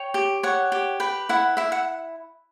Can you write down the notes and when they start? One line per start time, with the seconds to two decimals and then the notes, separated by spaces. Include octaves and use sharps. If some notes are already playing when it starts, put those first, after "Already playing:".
Already playing: C#5 G5
0.14 G4
0.43 C#5 F#5
0.72 G4
1.00 B4 G5
1.29 E4 F#5
1.57 E4 E5
1.72 F#5